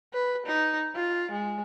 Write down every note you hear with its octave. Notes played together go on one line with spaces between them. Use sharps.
B4
D#4
F4
G#3